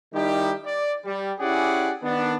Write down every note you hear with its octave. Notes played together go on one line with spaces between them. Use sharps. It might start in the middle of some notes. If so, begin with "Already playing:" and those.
D#3 G3 D#4 E4 G4
D5
G3
C#4 E4 G4 G#4 D5 F#5
D#3 B3 D4